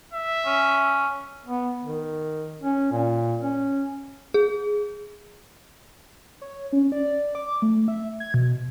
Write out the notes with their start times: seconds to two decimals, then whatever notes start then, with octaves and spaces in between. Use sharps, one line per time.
0.14 E5
0.46 C#4
1.45 B3
1.85 D#3
2.61 C#4
2.92 A#2
3.40 C#4
4.34 G#4
6.42 C#5
6.73 C#4
6.92 D5
7.35 D6
7.62 A3
7.88 E5
8.20 G#6
8.34 B2